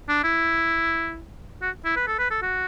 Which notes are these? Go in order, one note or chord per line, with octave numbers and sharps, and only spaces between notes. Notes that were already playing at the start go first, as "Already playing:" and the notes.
D4
E4
F#4
E4
B4
A4
B4
A4
F#4